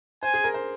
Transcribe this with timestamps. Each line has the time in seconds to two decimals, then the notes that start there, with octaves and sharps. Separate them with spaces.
0.23 C5 G#5
0.34 G#4
0.44 A#4
0.54 C5